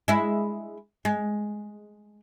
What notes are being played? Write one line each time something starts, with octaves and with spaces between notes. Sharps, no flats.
G#3 E4
G#3